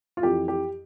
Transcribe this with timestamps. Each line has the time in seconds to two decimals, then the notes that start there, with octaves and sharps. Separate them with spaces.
0.17 F4
0.23 F2 E3 G4
0.48 G4